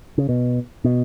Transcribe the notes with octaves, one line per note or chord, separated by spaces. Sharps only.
C#3
B2
B2